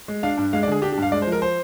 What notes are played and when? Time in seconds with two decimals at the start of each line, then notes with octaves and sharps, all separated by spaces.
0.08 G#3
0.23 D4 F5
0.38 G2
0.53 G#3 F5
0.63 D5
0.67 D3 G#4
0.82 D4 G4
0.92 G4
0.98 G2 F5
1.12 G#3 D5
1.22 C5
1.27 F3
1.32 A#4
1.42 C5